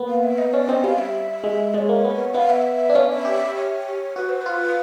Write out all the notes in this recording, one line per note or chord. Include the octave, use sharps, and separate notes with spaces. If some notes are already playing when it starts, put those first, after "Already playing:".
Already playing: A#3 B3
F5
E5
D#5
C#4 D5
C4 D#5
G3 F5
E5
G#3
G#3 C#5 D5
A#3
B3
B3 F5
E5
D4
C#4 F5
E5
G4
C#5
F#4 B4
C5
F4 B4